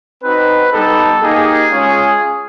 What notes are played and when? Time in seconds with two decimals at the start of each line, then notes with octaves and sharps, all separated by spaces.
0.22 C4 D#4 F#4 B4
0.72 G3 B3 D#4 G4 A4
1.21 A#3 D#4 G4 G#4
1.71 G#3 C#4 F4